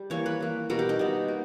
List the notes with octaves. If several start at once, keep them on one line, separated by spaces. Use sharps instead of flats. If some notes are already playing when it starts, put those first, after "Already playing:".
Already playing: G3
E3 A#3 C#5
B4
E3 A#3
B2 G3 B3 A#4
G4
D#4
B2 G3 B3
A#3